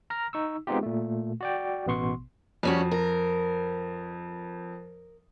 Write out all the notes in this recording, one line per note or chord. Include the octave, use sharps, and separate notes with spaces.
A#5 F6 A#6
D#4 C#6 E6
G#3 B3 C4 D#4 F4 G4
A#2 A3
F#4 D5 G5
A1 B2 B3 C6 C#6
F2 G3 C#4 F#4
A#4